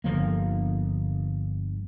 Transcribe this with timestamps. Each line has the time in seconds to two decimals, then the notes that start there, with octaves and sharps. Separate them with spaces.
0.04 G1 D3 F3 A#3